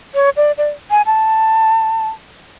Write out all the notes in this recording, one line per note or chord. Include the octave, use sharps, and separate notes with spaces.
C#5
D5
D5
G#5
A5